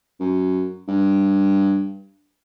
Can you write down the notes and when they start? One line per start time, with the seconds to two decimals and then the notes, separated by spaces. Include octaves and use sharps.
0.20 F#2
0.88 G2